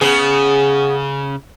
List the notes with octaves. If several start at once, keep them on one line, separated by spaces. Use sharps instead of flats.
C#3 B3 G#4